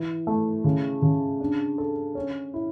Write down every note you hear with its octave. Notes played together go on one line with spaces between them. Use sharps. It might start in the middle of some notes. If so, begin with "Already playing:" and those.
Already playing: E3 E4
A3
C#3
C#3
D4
A4
C#4
E4